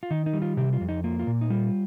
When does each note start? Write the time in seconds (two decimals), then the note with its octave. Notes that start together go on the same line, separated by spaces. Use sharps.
0.03 F4
0.11 D#3 D#4
0.26 D#4
0.33 G3
0.42 F4
0.57 C3 G4
0.73 F4
0.81 F2
0.89 D#4
1.04 A#3 F4
1.20 F4
1.27 A#2
1.41 D#4
1.50 G3 F4